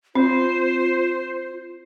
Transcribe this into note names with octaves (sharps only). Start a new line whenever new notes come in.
C4 F4 C5